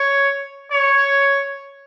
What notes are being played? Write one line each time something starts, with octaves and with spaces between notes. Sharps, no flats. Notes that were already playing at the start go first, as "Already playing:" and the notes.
Already playing: C#5
C#5